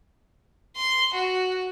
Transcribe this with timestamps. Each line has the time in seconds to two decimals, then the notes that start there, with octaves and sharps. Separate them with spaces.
0.76 C6
1.14 F#4